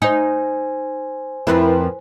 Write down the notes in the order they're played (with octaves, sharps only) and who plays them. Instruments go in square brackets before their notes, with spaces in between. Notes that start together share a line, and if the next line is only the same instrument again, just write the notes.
[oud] D#4 [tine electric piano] C5 G#5
[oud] F2 F3 C4 [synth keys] E4 A#4 B4